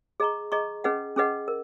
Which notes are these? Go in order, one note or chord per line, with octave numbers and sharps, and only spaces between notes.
G#4 D#5 A#5 C#6
G#4 D#5 A#5 C#6
C#4 G#4 B4 D#5 F#5
C#4 G#4 B4 D#5 F#5
A#4